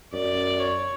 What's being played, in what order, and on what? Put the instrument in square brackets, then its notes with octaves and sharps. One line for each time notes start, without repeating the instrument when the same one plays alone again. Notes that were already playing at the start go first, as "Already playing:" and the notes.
[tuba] F#2 [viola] D5
[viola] C#5